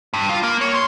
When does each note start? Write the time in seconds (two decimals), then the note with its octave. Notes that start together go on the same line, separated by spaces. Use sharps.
0.13 G2
0.29 F4
0.43 A#3
0.61 C#5
0.74 C6